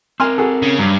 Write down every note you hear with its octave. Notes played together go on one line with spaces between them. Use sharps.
C4 A#4 G#5 C6 F6
F#4 G#4 A4
C#3
G2 F#3